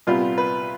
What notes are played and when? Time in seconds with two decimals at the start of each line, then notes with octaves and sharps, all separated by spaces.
0.07 C2 A#2 G3 B3 F4
0.38 B4